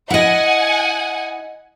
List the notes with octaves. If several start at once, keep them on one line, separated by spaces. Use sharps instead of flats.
E4 D#5 F#5 G#5